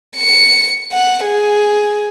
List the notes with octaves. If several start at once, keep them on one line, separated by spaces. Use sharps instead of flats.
C#7
F#5
G#4